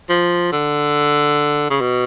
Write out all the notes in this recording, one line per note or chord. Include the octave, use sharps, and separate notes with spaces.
F3
D3
C#3
B2